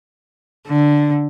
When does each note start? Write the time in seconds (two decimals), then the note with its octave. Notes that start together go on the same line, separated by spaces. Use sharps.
0.67 D3